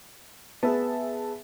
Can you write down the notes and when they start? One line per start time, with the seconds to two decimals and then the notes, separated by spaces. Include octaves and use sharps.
0.63 B3 G#4 E5 A5